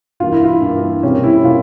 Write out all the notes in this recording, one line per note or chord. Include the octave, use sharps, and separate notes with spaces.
G2 E3 A#3 F4
E4
F4
G2 E3 A#3
C3 G3 A#3 C#4
E4
C3 G3 A#3 F4